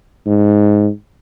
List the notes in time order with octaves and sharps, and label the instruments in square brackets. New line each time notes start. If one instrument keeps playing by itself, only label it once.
[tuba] G#2